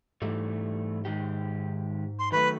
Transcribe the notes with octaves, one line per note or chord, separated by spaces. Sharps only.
G#2 E3 G3 A3
D#3 G#3 G4
C6
D#3 F#3 A3 B4